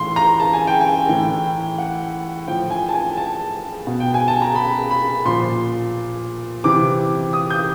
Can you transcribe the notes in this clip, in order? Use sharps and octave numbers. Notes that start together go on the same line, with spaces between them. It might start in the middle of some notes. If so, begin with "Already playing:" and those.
Already playing: A2 E3 C6
A#5
A5
G#5
G5
G#5
A2 E3 G5
F#5
A2 F3 G5
G#5
A5
G#5
A5
B2
G5
G#5
A5
A#5
B5
B5
A#2 F3 C6
C3 E3 D6
D#6
G6